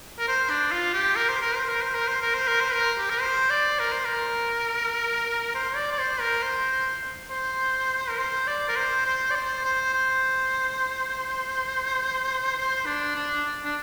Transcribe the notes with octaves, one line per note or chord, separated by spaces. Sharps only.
A#4
C5
D4
F4
G4
A#4
C5
A#4
C5
A#4
C5
A#4
C5
A#4
C5
A#4
C5
A#4
G4
A#4
C5
D5
A#4
C5
A#4
C5
D5
D5
C5
A#4
C5
C5
A#4
C5
D5
A#4
C5
C5
D5
C5
C5
C5
C5
D4
D4
D4